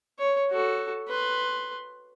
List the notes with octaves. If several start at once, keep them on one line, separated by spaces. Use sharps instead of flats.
C#5
F#4 A4
B4 C6